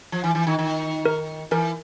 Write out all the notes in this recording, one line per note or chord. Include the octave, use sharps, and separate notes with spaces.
F3
E3
E3
D#3
D#3
A#4
E3 A#4